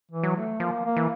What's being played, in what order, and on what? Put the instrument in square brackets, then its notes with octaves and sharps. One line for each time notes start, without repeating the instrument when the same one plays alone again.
[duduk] E3
[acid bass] F#3
[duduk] A3
[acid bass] F3 [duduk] A#3
[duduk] A#3
[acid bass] E3